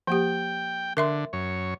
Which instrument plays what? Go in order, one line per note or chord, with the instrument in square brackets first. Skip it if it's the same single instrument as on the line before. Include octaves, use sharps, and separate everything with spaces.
[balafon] F3 A#3 G4 [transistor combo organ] G5
[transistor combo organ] D3 [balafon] A#4 E5 C6
[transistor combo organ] F#2 C#5